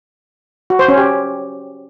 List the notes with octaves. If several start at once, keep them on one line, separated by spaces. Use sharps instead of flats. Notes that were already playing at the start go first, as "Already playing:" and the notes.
F#4
C5
C#4
G4